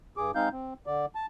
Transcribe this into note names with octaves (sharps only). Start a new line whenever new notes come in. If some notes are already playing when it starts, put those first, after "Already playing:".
G2 G#4 D6
G#3 C4 D#4 F5 G6
C4
D3 D5
A5